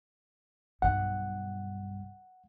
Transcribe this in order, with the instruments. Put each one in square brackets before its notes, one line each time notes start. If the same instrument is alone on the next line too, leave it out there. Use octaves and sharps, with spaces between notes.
[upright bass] B1 G2 [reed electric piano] F#5